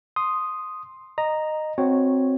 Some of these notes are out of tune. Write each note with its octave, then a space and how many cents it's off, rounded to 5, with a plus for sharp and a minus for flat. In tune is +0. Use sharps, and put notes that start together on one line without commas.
C6 +0 D#6 +0
D#5 -15 A#5 +0
C4 +0 F#4 -15 C#5 +0